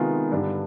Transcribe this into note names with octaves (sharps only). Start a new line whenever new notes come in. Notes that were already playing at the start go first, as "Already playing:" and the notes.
Already playing: C3 D#3 G#3 B3 F4
G2 D3 G3 D4